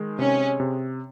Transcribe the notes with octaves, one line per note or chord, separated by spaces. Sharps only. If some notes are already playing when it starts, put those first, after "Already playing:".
Already playing: D#3 G#3
C3 C#4
C3